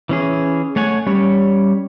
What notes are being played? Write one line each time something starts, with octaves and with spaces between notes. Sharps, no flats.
E3 C#4 G#4
A3 C#5 F#5 G#5
G3 C#4 C#5